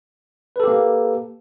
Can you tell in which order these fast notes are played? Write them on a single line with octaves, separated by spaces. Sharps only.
B4 A4 G4 A#3